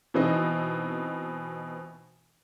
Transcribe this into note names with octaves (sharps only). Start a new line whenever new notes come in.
B2 E3 C4 D#4